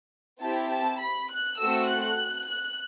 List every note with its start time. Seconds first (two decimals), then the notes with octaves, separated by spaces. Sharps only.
0.42 C4 E4 G4 A5
0.72 A5
1.01 B5
1.31 F#6
1.59 A3 C4 F#4 A4 E6
1.88 F#6
2.48 F#6